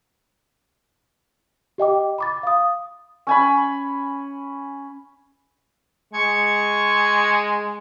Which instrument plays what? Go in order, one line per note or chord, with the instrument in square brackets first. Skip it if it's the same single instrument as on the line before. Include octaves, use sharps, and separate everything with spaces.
[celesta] G4 D#5 G5 D6
B5 D6 A6
F5 D#6
[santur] C#4 G#5 B5
[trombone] G#3 [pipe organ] C#6 G#6